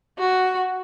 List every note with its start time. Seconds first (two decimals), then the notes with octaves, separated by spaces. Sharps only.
0.19 F#4